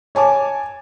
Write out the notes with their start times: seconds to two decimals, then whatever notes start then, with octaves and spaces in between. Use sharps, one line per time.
0.15 C#5 G#5 A5 D6